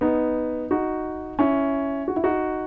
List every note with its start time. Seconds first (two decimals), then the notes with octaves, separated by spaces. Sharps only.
0.01 B3 D#4
0.71 D#4 F#4
1.39 C#4 E4
2.08 F#4
2.16 E4
2.24 D#4 F#4